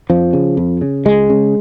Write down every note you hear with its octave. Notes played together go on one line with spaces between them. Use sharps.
F2 F3
C#3
F2
C#3
C#2 G#3
C#3